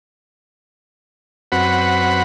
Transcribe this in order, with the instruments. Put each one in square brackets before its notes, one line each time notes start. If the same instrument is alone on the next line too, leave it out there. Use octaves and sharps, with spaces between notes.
[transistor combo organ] F#2 C4 F#4 B4 F#5 B5